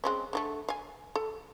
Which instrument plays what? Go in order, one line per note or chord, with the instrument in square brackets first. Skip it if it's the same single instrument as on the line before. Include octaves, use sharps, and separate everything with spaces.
[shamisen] G#3 C4 C#4
D3 F#3 A3
F5 G#5
A4